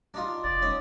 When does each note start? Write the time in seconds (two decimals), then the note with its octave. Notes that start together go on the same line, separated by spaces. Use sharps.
0.14 D4 D#4 F4
0.44 F1 D5
0.62 C#4 D#4